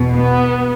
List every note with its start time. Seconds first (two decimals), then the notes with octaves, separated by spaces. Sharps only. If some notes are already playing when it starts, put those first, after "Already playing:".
Already playing: E2 B2
0.15 B3